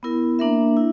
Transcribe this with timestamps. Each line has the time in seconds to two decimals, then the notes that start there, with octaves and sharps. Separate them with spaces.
0.03 B3 E4 A#4
0.39 A#3 D4 A#4 E5
0.77 E4